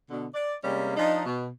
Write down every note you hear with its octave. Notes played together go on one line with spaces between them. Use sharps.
B2 D3
D5
C3 G3 G#3 A#3 C#4
F3 D4 D#4
B2